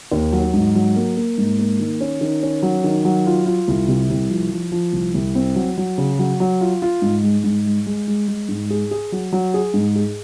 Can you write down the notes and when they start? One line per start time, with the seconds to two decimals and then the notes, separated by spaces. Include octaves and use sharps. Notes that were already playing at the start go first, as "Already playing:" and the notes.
0.12 D#2
0.32 F#3
0.54 G#2
0.75 F#3
0.96 A#3
1.17 A#3
1.38 G#2
1.59 A#3
1.79 D#3
2.01 C#4
2.21 D#3
2.43 C#4
2.63 F#3
2.84 D#3
3.05 F#3
3.27 F4
3.46 F4
3.68 C2
3.88 C3
4.10 C2
4.30 F3
4.51 F3
4.72 F3
4.93 C2
5.14 C2
5.35 C4
5.56 F#3
5.78 F#3
5.98 C#3
6.19 F#3
6.40 F#3
6.61 F4
6.82 F4
7.02 G#2
7.23 G#3
7.44 G#2
7.66 G#3
7.86 G#3
8.07 G#3
8.28 G#3
8.49 G#2
8.70 G#4
8.91 G#4
9.12 F#3
9.33 F#3
9.54 G#4
9.74 G#2
9.95 G#4